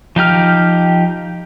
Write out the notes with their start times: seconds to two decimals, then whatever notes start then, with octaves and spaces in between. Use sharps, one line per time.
0.16 F3 D#4 G4 F6